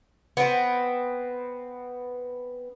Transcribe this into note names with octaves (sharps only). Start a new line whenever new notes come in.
B3 C4